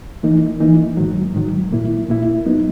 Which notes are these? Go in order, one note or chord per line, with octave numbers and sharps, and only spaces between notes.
E3 A#3 D#4
E3 A#3 D#4
G#2 D#3 F#3
G#2 D#3 F#3
A#2 A#3 E4
A#2 A#3 E4
F#3 B3 D#4